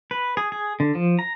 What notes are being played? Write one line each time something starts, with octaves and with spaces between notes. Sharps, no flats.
B4
G#4
G#4
D3
F3
A#5